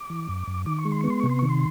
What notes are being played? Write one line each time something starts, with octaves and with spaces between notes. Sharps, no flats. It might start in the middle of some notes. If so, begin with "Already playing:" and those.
Already playing: D6
E3
F#2
F#2
D#3 D6
C#6
G#3
C6
B3 C#6
C6
C3 C#6
C6
D#3 C#6
C6